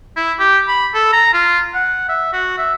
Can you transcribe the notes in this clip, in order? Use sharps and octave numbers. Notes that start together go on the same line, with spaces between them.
E4
G4
B5
A4
A#5
F4
F#5
E5
F#4
E5